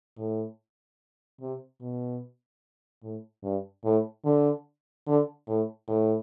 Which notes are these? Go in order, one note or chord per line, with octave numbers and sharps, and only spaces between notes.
A2
C3
B2
A2
G2
A2
D3
D3
A2
A2